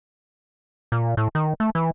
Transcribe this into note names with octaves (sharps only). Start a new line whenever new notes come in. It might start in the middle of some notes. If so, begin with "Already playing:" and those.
A#2
A2
D#3
A3
E3